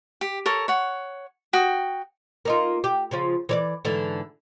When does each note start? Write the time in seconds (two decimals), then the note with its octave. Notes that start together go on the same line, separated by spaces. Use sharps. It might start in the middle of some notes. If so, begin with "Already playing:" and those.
0.21 G4
0.46 A4 A#4 C#5
0.68 C#5 F#5
1.53 F#4 G5 D#6
2.45 A#3 D#4 F4
2.84 G4
3.11 C#3 F3 F4
3.49 E3 C#5 D5
3.85 G#2 D3 E3